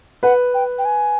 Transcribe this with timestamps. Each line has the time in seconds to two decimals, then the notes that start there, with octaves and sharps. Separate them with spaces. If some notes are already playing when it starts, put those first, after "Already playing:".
0.23 B4 F#5
0.54 G5
0.78 G5
0.85 G#5